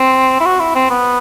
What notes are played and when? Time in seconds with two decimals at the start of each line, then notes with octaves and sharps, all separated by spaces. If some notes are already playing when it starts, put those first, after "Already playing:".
Already playing: C4
0.40 E4
0.46 F#4
0.60 E4
0.75 C4
0.90 B3